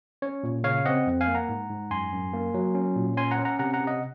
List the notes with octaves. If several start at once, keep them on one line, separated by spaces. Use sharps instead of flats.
C#4 C#5
A#2
C#3 C#5 F5
C4 D#5 F#5
F2
F5 G#5
A#3
F#5 A#5
G#2
G#2
F#2 G#5 C6
F#2
A#3
F#3
C#4
A#2
C#4 G#5 C6
F#5 A#5
C#4
F#5 A#5
C3 F#5 A#5
F#5 A#5
C3
D#5 F#5